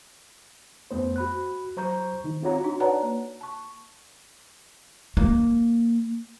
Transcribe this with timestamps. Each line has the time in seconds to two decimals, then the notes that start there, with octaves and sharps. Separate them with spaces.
0.91 F2 A3 B3 C5
1.16 F#4 B5 F#6
1.77 F#3 C5 A#5 C#6 G6
2.24 D#3 D#4
2.42 C4 F4 F#4 C#5 F#5 A#5
2.64 D4 D#4 F#4
2.80 B4 C#5 D5 F#5 A5 A#5
3.02 A#3
3.41 A5 C#6
5.17 A#3